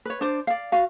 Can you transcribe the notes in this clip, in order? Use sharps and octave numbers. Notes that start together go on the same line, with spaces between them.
B4 C#5
D4 C5 D5
D5 F5
F#4 F5